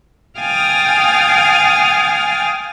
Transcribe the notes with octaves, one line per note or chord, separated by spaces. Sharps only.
F5 G5 G#5 D#6 F6 A6